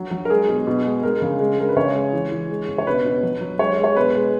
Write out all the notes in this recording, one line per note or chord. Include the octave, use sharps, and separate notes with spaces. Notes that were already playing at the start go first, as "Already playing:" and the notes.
Already playing: F#3 F#4
F#3
A#4
G#3 G#4
B2
B2
G#3
G#3 A#4
C#3
G#3
G#3 A#4
B4
C#3 C#5
G#3
E3
E3
G#3
C#3
C#5
B2 B4
B2
F#3
F#3
G#3 C#5
G#3
C#5
B2 B4
G#3